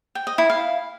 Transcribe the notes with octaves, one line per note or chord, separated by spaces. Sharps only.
G5
D#5
E4
F5